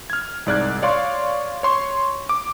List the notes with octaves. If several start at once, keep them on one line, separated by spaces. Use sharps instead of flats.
F6 G#6
C2 G#2 D5 F6 F#6 G#6
C#5 D5 F5 C6 C#6
C#5 C6 C#6
D6